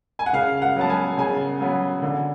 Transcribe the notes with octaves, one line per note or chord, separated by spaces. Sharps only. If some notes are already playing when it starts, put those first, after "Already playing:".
G#5
F#5
C#3 F5
F5
F#5
F#3 B3 A5
G#5
C#3 G#5
F#3 B3
D3